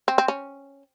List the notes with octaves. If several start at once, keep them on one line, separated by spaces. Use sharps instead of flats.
C4
C4
C#4